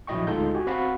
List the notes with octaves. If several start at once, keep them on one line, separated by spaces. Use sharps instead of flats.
A#1 F#3 E4 D#5 G5 C#6
D2 G#3 D#4 F4 A4 G6
F#4 G4 G#5
C4 F#4 F5 F#5 B5